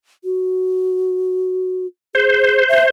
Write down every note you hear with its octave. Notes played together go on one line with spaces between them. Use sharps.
F#4
G#4 C5
E5